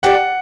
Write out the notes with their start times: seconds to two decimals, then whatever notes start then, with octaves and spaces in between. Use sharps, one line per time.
0.03 G3 D4 A4 D5 F#5